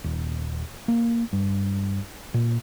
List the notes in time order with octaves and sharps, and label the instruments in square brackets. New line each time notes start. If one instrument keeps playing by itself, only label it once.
[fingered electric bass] D#1
A#3
G2
A#2